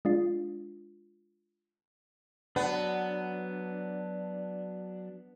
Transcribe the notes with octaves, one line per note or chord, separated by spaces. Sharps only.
G#3 D4 F4
F#3 B3 D4